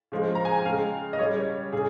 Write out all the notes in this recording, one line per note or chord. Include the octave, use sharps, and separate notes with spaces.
C#3 F3 G#3
A#5
G#5
G5
C#3 G#3 F5
D#5
C#3 G3 C#5
C#5
C#3 G#4